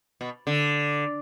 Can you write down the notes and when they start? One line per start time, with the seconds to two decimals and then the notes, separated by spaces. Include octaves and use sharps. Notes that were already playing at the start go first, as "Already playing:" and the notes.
0.21 B2
0.47 D3